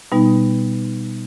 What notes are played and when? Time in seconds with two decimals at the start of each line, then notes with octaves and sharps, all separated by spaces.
0.12 B2 G3 B3 D#4